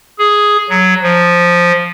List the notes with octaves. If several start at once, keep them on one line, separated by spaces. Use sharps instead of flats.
G#4
F#3
F3